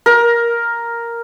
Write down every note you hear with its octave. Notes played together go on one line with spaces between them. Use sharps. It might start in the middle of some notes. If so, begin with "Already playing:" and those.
A#4